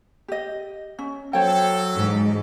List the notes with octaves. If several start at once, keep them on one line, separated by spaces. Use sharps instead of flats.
G4 D#5
C#4
F#3 A4 C5 C#5 G5
G#2 E3